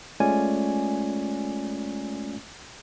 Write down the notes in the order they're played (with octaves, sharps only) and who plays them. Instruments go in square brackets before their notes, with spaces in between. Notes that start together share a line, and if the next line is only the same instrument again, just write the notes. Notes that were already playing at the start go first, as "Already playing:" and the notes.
[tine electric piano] G#3 A3 C#4 F4 D5 G#5